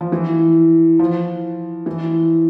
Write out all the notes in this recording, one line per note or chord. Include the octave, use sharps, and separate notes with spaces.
F3
E3
F3
E3